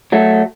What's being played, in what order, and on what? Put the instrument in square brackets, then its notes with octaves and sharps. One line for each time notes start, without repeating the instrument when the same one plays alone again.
[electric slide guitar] F#3 A3